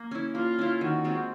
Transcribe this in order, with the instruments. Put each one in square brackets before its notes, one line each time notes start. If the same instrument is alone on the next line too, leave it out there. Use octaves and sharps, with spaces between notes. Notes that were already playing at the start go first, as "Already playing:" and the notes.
Already playing: [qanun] A#3
C#4 E4
[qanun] A#3 [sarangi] F4
[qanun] C#4 E4
[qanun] D#3 [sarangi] F#4
[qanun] G#3 C4 F4